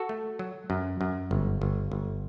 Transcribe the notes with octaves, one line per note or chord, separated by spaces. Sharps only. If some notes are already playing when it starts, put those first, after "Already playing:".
Already playing: F#4 A4
A3
F#3
F#2
F#2
G1
G1
G1